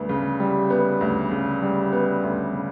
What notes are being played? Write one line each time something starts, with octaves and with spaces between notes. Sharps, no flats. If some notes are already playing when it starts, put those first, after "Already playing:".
Already playing: D2 G3 B3
C#3
G3
B3
D2
C#3
G3
B3
D2
C#3